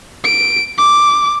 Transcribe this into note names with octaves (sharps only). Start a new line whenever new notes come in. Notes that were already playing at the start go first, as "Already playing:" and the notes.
D7
D6